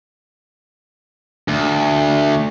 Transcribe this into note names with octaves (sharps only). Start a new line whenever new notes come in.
D2